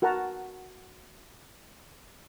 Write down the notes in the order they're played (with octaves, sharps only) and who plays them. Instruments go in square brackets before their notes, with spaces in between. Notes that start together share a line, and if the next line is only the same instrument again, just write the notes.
[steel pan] F#4 A#4 F#5 A5 A#5